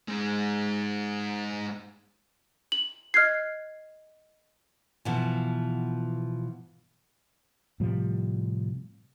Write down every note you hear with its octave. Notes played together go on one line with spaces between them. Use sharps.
G#2 G#3
F#7
D#5 F6 F#6 G#6 C7
B2 E3 F3
A2 C3 F3 G3